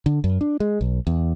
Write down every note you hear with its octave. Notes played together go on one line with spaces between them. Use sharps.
D3
F#2
D4
G#3
B1
E2